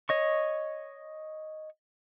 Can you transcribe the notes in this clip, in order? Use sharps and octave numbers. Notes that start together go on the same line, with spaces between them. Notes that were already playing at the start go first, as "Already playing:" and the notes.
C#5 D#5 C#6